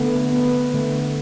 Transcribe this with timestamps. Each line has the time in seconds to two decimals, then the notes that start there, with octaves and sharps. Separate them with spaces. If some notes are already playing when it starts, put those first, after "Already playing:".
Already playing: D3 A3 B3
0.32 B3
0.74 D3 A3